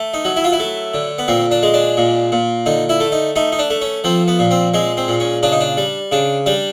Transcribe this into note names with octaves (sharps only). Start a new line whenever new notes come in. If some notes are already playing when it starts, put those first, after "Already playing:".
Already playing: A3
D#4
F#3
E4
F4
E4
A3
D3
B3
A#2 C4
D4
G#3
D4
A#2
A#2
D3 D#4
E4
A3
D#4
A3 D#4
D#4
D4
A3
C#4
F3 C4
B3
A#2
C4
G#3 C4
C4
A#2
C#4
C#3 D4
D#4
D4
G3
C#3 D4
G3 D4